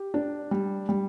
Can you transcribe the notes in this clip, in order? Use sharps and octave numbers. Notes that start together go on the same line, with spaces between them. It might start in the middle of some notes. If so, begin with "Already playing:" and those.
Already playing: G4
D4
G3
G3